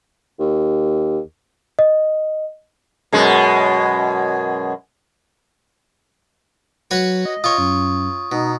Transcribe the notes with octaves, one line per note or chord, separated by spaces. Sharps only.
D#2
D#5
F#2 B2 G#3
F#3 F#4 B4 C#5
D#5
F4 C#5 C#6 D#6
F#2
B2 D#4